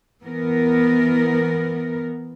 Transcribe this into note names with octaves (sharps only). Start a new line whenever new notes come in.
E3 B3 A#4